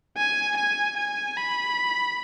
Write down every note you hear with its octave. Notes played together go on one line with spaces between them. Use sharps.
G#5
G#5
G#5
B5